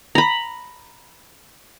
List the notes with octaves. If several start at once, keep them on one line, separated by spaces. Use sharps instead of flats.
A#5 B5